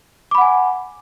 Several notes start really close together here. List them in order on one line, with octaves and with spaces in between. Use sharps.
D6 B5 F#5 G#5